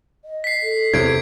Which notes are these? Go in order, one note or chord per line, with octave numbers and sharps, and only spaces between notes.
D#5
B6 C7
A4
E2 C3 G#6 D7